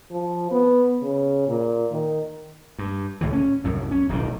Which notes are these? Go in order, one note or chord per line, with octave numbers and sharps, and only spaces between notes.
F3
B3
C#3
A#2
D#3
G2
C#2 A2 D#3 E3
C#4
C2 F#2 A2
C#4
D1 B1 B2 D#3